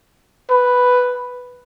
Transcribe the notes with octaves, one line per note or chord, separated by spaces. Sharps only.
B4